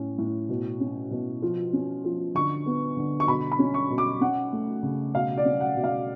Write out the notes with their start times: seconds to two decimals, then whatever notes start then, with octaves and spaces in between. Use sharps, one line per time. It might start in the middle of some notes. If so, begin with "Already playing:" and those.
Already playing: A2 C#4
0.18 A2
0.49 B2
0.80 C#4
1.11 B2
1.42 F3
1.73 C#4
2.05 F3
2.35 D3 C#6
2.66 B3
2.97 D3
3.20 C#6
3.28 B2 B5
3.52 B5
3.59 C#4
3.74 C#6
3.90 B2
3.98 D6
4.21 C#4 F#5
4.53 A3
4.83 C#3
5.14 B2 F5
5.37 D5
5.45 C#4
5.61 F#5
5.76 B2
5.84 F5